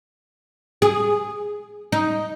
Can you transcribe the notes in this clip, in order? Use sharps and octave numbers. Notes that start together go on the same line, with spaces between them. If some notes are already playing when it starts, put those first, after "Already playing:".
G#4
D#4